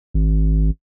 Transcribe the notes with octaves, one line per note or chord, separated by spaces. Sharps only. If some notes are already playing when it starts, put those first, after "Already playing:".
G#1